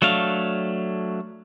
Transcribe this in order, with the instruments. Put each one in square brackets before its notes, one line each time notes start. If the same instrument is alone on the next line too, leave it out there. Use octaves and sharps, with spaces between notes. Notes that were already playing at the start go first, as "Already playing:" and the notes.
[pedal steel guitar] F#3 A3 D4 F5